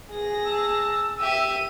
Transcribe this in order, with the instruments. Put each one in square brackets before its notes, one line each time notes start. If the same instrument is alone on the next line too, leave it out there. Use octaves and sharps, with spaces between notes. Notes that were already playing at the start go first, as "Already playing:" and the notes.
[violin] G#4 A#6
[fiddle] A5 [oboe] E6
[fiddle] G4 E5 [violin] D#7